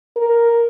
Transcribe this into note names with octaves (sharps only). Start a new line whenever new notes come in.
A#4